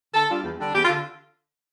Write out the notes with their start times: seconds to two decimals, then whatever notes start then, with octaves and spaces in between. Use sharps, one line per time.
0.13 D3 A4
0.29 G3 D4 F4
0.44 E2
0.59 D3 G3 D4
0.75 E2 G4
0.85 F4
0.90 D3